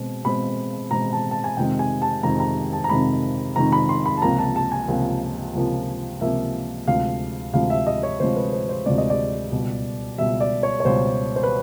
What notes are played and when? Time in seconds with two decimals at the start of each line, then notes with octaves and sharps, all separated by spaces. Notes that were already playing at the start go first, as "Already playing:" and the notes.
Already playing: B2 G#3 C4
0.25 B2 G#3 C4 B5
0.91 B2 G#3 C4 A#5
1.13 A5
1.31 A5
1.44 G#5
1.57 F2 C3 D#3 G#3 C4 G5
1.79 G#5
2.02 A5
2.23 F2 C3 D#3 G#3 C4 A#5
2.40 A#5
2.73 A5
2.84 A#5
2.89 F2 C3 D#3 G#3 C4 B5
3.56 F2 C3 D#3 G#3 C4 A#5
3.72 B5
3.89 C6
4.06 B5
4.17 A5
4.22 C#2 C3 F3 A#3 A#5
4.39 A5
4.56 A5
4.72 G#5
4.88 C#2 C3 F3 A#3
5.55 C#2 C3 F3 A#3
6.21 C#2 C3 F3 A#3 E5
6.87 D2 C3 F3 G#3 F5
7.53 D2 C3 F3 G#3 F5
7.70 E5
7.87 D#5
8.03 C#5
8.20 D2 C3 F3 G#3 C5
8.36 B4
8.53 C5
8.69 C5
8.86 D2 C3 F3 G#3 D5
8.98 D#5
9.10 D5
9.52 C#2 B2 G3
10.18 C#2 B2 G3 E5
10.40 D5
10.63 C#5
10.80 C#5
10.85 C#2 B2 G3 C5
11.36 C5
11.43 B4